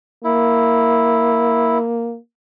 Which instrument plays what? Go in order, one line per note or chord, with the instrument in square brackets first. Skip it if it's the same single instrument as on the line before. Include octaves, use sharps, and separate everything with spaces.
[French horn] A#3 [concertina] E4